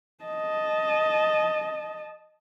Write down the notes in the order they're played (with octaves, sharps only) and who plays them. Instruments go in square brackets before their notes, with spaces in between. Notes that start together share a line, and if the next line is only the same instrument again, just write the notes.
[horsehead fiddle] D#5 A5